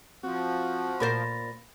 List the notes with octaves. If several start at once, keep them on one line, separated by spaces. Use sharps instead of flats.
F3 C4 F#4
A#2 A#4 C5 B5 A6 A#6